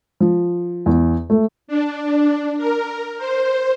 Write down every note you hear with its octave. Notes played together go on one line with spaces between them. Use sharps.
F3
E2
A3
D4
A#4
C5